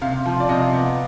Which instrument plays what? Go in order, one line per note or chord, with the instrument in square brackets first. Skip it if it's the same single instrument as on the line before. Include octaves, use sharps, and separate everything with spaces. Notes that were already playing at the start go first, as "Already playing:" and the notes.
[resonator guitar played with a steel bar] C3 [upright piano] F5
[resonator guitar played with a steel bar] F3
[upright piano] D5
[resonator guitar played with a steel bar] C3 [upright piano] D#5
[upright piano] F5
[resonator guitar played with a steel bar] B3